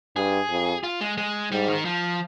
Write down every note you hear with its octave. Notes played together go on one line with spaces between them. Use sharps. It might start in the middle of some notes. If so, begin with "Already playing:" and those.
G2 G#4
F2
F4
G#3
G#3
G#2 G3
D#3
F3